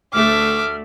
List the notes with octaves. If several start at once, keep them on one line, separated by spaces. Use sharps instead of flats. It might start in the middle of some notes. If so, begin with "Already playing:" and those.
D2 A3 E5 D6 F6